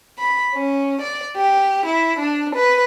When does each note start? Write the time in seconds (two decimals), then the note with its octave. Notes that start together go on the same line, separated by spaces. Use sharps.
0.20 B5
0.55 C#4
1.02 D5
1.37 G4
1.87 E4
2.20 D4
2.55 B4